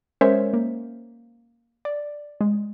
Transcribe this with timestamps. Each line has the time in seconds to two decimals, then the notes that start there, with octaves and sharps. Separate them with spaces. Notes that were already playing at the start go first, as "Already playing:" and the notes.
0.21 G#3 C#4 A#4 C5 C#5 E5
0.54 A#3
1.85 D5
2.41 G#3